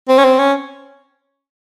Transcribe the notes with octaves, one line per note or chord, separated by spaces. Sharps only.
C4
C#4
C4
C#4